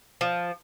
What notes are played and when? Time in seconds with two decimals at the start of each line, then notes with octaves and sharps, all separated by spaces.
0.21 F3